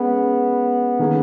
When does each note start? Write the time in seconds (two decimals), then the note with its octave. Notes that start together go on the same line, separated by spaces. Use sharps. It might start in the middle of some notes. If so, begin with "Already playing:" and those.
Already playing: G#3 B3 C#4 G#4
0.99 D#3 A#3 C#4 G#4